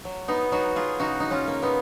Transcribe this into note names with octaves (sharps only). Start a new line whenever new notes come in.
F#3
B3 D#4
F#3 D#4 F#4
F4 G#4
C#3 D#4 F#4
D#4
C#4 F4
A#3
B3 D#4